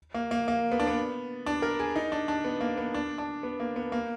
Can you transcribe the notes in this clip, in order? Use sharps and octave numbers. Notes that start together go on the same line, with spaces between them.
A#3
A#3
A#3
B3
D4
B3
D4
A#4
G#4
D#4
D4
D4
B3
A#3
B3
D4
D4
B3
A#3
B3
A#3